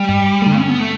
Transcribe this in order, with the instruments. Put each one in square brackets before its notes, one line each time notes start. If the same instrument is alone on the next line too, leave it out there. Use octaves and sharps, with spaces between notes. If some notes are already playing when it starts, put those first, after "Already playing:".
Already playing: [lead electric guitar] G3
[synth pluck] G2
D3 A3
[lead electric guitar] C#4
B3
A3